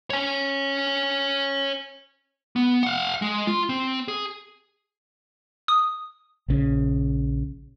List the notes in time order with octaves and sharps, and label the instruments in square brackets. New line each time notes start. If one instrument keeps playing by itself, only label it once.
[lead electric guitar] C#5 G#5
B3
F5 F#5
G#3
F4
C4
G#4
[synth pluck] D#6
[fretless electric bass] A#1 C#3